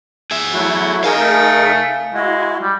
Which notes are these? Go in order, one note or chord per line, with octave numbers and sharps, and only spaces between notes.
G#4 E5
F#3 A3 E4 F#4
D#4 G#4 A#4 F5 G#5
A3
G#3 E4 F#4
G3